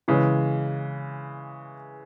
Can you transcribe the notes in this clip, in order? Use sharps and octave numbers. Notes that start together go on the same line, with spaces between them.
C#3 E3 G#3